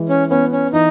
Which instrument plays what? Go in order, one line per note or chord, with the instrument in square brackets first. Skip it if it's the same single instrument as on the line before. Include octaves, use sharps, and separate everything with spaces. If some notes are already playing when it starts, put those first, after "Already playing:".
Already playing: [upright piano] E3 G#3
[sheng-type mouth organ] C#4
[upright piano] B3 [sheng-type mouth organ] C#4
[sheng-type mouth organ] C#4
[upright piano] E3 [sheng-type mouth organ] D#4